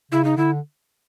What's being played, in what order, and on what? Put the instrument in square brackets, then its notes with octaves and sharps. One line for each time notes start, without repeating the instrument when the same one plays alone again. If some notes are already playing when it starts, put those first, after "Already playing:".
[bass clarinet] C#3 [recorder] E4
[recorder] D#4
[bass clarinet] D3 [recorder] E4